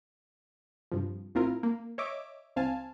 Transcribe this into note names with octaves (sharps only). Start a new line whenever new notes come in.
G2 C3 F3
A1 C4 E4 F4 A#4
A#3
C#5 D#5 E5 D6
C2 C4 F5 G#5 A5